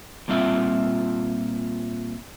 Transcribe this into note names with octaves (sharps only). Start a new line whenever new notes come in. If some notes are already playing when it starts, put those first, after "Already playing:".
A#2 G3 C4 F4 E5